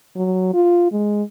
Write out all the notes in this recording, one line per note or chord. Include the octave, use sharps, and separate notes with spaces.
F#3
F4
G#3